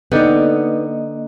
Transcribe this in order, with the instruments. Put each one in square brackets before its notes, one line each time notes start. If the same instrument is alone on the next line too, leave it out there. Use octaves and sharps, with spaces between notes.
[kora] D3 G4 D5 [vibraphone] A#3 D#5 [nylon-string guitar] B3 D#4